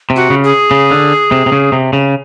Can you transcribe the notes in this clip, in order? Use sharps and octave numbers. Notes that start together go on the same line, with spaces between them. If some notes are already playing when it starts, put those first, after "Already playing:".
C3
F#4
C#3
G#4
C#3
D3
C3
C3
C#3
C3
C#3